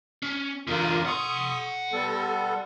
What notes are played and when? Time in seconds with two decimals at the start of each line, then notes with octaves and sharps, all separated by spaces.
0.23 C#4
0.67 E2 D3 F4 A#4
1.06 F#5 C6 C#6 D#6
1.93 G3 B3 A4